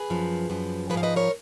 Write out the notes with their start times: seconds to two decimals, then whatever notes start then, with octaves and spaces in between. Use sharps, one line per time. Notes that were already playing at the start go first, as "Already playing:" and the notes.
Already playing: G#4 B4
0.10 F#2 F3
0.50 F#2 F3
0.90 F3 G#4 B4
0.94 G#2 F5
1.03 B4 D#5
1.16 A#4 C#5